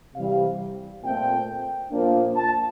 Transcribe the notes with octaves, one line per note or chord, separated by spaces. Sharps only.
C3 E3 G3 F5
A#2 A3 C4 G5
A#2 F3 A#3 D4
A5